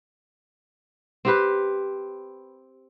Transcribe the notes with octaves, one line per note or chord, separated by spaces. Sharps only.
C4 G4 B4